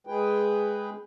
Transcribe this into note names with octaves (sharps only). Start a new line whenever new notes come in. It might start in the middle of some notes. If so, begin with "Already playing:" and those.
G#3 G#4 B4 G5